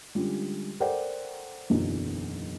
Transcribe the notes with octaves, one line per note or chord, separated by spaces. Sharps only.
D3 G3 G#3 C#4 F4
A4 A#4 C5 D5 F#5 G5
F#1 B1 E2 B2 D3 F#3